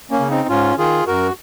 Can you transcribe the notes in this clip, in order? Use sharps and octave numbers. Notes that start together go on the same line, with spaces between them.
A#3 C#4
C#3
C4 D#4
G#2 C#4 F4
D#3 F4 G#4
F#2 F#4 A#4